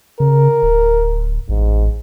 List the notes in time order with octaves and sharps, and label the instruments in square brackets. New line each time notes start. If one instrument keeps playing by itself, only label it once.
[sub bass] C#3 [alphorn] A#4
[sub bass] D1
[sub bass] A1 [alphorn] G#2